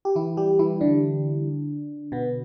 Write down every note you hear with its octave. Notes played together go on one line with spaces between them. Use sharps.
G4
E3 E4
G3 G4
E3 E4
D3 D4
B2 B3